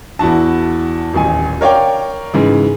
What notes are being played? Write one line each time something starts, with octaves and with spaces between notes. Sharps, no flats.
E2 E4 F#4 A5
D#1 A1 G#5
A#4 C#5 D5 F5 G5
G#2 C#3 E3